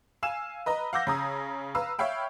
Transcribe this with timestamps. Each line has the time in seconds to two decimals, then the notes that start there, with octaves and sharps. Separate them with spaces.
0.23 F5 G#5 E6 E7
0.66 B4 D#5 A#5 B5
0.93 F5 F#5 D6 E6 G6 A#6
1.07 C#3 A#5 D#6
1.75 B4 F5 A#5 E6
1.99 C#5 E5 F5 G5 B5